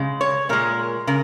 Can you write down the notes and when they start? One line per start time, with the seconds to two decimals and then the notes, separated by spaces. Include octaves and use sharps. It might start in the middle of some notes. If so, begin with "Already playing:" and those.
Already playing: C#3 G#3
0.21 C#5
0.49 A#2 G#3 A#4
1.07 C#3 A#4